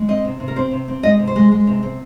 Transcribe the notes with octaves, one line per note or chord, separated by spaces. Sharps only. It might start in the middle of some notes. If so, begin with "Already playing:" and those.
Already playing: G#3
C4 D#5
C3
C3
A#4
C4 C5
C3
C4
G#3 D#5
C3
C5
G#3
G#3
C3
C4